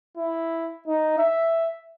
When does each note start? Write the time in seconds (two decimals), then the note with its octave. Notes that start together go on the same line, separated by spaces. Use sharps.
0.17 E4
0.87 D#4
1.18 E5